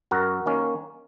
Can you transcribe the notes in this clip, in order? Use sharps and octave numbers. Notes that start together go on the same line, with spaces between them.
F#2 F#4 A#4
D#3 A#3 C#4